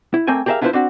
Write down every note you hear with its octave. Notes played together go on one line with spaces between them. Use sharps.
E4
A3 A#3 C4 G5 G#5
G4 G#4 A#4 C5 E5 F5
D4 E4 F4 G#4 B4 C5
C4 D4 F#4